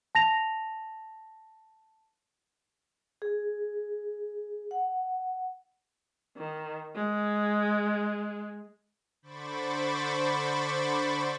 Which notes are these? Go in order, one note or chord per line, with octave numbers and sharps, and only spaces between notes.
A5 A#6 F7
G#4
F#5
D#3
G#3
D3 C5 B5 C#6 D6 A6